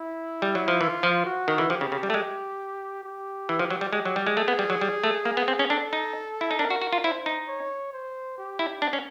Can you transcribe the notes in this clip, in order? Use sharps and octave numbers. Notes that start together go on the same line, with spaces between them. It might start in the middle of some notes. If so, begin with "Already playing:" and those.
Already playing: E4
G3
F#3
F3
E3 F4
F3
F#4
D#3
E3
F3 G4
C#3
C#3
G3
A3
G#3
G4
E3
F3
F#3
G3
G#3 G4
F#3
G3
G#3
A3 G#4
B3
G3
F#3
G3
A3
A#3
B3
C4
C#4
D4 A4
D#4
E4
D#4
D4 A#4
F#4
F#4
F4
E4 C5
D#4
C#5
C5
G4
E4
D4
C#4